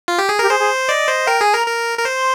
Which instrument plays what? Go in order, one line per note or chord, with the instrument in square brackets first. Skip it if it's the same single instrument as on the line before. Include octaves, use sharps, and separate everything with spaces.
[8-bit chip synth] F4
G4
G#4
[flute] G4 [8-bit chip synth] A#4
[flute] G#4 [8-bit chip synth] C5
[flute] G#4
[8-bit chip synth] D5 [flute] D#5
[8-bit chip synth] C5
[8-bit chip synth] A#4 [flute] G5
[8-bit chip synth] G#4 [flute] G#5
[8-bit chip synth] A#4 [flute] A#5
[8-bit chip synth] A#4
A#4
[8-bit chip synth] C5 [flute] C6